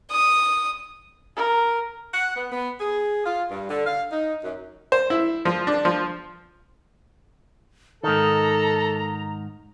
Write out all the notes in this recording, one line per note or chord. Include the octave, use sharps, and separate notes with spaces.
D#6
A#4
F#5
B3
B3
G#4
F4
G2
D3
F5
D#4
F#2
C5
E4
F3
D4
F3
G#2 D#3 A4 A#5